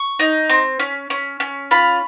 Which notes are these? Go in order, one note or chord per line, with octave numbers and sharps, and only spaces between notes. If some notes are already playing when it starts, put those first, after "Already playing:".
Already playing: C#6
D#4
C4
C#4
C#4
C#4
F4 B5